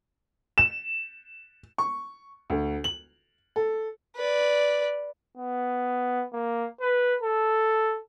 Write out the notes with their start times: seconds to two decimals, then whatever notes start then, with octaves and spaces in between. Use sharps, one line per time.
0.58 E7
1.78 C#6
2.50 D2
2.84 F#7
3.56 A4
4.16 B4 D5
5.37 B3
6.33 A#3
6.81 B4
7.22 A4